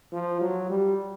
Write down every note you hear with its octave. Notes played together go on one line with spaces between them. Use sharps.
F3
F#3
G3